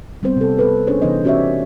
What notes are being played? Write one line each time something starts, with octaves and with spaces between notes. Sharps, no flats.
G3 B3 C4 C5
C3 A4
B3 A4 B4
C#4 D4 G#4 C5 C#5
C3 E3 B3 D#4 C5 D#5
C#4 F#4 G4 C#5 D5 E5